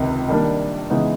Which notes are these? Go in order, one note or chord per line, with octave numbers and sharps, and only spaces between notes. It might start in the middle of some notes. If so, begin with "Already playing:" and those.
Already playing: C#2 C3 D#3
D#3 G3 A#3 D4
C#3 E3 G#3 B3 D#4